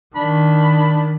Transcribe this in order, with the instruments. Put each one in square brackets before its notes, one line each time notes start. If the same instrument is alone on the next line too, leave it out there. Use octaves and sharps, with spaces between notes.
[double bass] D#3 [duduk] D4 [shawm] B5